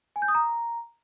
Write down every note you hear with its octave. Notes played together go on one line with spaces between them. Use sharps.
G#5
G6
D#6
A#5